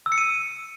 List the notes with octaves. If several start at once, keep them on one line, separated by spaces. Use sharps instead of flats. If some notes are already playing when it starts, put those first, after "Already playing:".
E6
C#7
D#7